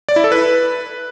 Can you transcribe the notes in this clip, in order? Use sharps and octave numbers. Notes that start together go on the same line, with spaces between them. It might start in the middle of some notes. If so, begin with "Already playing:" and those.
D5
E4
A4
B4